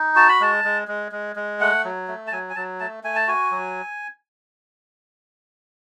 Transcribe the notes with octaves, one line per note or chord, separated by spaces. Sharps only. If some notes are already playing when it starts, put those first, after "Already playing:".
Already playing: D#4
F#4 A5
B5
G#3 A5
G#3
G#3
G#3
G#3
A3 F#5
F#3
A3
A5
F#3 G#5
G#5
F#3 A5
A3 A5
A3 G#5
A5
F#4 G#5
F#3